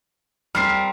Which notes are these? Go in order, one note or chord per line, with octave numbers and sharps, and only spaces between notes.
G3 C4 A#4 F6 C7